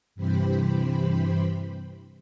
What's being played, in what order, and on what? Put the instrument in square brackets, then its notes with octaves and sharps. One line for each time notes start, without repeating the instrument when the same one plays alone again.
[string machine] G2 C3 E3 G4 C5 B5